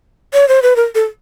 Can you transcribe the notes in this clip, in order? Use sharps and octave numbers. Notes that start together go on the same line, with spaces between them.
C#5
C5
B4
A#4
A4